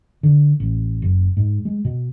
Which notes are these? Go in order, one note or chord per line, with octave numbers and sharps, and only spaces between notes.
D3
A1
F#1
G#2
G#3
B2